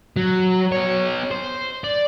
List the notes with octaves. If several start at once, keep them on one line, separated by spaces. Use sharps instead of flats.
F#3
B3 C#5
C5
D5